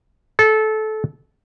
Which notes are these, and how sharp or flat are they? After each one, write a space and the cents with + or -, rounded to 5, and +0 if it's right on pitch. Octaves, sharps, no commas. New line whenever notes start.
A4 -20